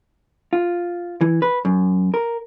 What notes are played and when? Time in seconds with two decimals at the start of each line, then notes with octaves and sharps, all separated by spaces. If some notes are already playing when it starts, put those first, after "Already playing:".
0.53 F4
1.21 E3
1.42 B4
1.65 F#2
2.14 A#4